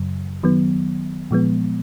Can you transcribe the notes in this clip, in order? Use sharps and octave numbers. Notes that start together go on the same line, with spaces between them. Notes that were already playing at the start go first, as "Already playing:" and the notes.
Already playing: F#2 C#3 F#3
D#3 F#3 B3
A#2 F3 G#3 B3